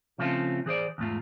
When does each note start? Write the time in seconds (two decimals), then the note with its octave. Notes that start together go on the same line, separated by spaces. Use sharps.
0.18 C#3 F3 A3 C4 C#4 F4
0.66 E3 G#4 C5 D5
0.98 E2 G#2 A3 F4